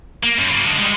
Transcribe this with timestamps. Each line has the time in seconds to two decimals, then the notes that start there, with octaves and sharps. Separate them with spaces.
0.23 A#3
0.39 F#2
0.51 C#3 A#3
0.65 D3 G#3
0.79 G3 G#3